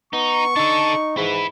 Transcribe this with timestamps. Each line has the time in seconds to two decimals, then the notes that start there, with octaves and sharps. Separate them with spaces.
0.13 B3 D#4 C#6
0.56 D4 D#4 A4
1.17 G#2 E4 B4